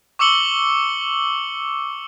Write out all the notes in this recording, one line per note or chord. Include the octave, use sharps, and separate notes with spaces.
C#6 D6 E6 C#7 F#7 G7